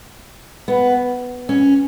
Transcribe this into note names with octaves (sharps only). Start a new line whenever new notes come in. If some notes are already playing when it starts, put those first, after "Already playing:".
B3
C#4